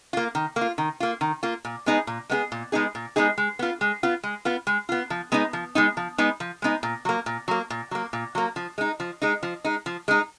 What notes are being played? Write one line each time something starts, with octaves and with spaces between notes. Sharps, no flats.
A#3 F4
D#3
A#3
F4
D#3
A#3 F4
D#3
A#3 F4
A#2
G#3 B3 D#4 G#4
A#2
G#3 B3 D#4 G#4
A#2
G#3 B3 D#4 G#4
A#2
G#3 B3 D#4 G#4
G#3
B3 F4
G#3
B3 F4
G#3
B3 F4
G#3
B3 F4
F3
G#3 B3 D#4
F3
G#3 B3 D#4
F3
G#3 B3 D#4
F3
G#3 B3 D#4
A#2
F#3 A#3
A#2
F#3 A#3
A#2
F#3 A#3
A#2
F#3 A#3
F3
G#3 D#4
F3
G#3 D#4
F3
G#3 D#4
F3
G#3 D#4